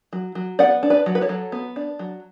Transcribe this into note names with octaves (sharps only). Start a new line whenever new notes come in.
F#3
F#3
B3 D5 F#5
D4
B4 D5
F#3
B4
A4 C#5
F#3
B3
D4
F#3